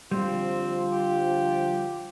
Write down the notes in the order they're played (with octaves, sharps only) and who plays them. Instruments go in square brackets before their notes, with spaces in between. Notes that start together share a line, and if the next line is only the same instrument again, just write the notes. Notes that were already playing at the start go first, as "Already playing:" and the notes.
[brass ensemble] D3 F3 F4 [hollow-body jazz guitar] G3 [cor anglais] C4
[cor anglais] G4